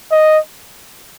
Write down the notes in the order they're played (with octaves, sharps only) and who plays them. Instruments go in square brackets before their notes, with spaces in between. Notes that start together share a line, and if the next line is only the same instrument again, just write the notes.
[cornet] D#5